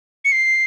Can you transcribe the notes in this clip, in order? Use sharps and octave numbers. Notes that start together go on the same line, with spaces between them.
C#7
C7